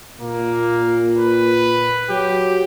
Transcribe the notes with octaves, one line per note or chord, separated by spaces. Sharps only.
A#2 A#3
B4
F#3 G4